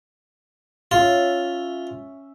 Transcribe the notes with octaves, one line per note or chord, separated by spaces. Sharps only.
C#4 F4 E5